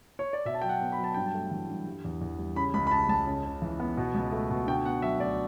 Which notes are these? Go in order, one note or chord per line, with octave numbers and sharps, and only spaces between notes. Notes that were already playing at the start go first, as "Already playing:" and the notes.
C#5
D5
B2 E5
A5
F#3 G5
F#5
B3
B5
F#3
A5
G2 G5
A5
A3
E3
G2
G3
E2
E2
G3
C#3 B5
C#2 B5
B5
C#3 A5
C#2 A5
C#3
C#3
E3
B3
B2
C#2
A3
B2
D3 G5
B3 F#5
F#3 E5
D2 D5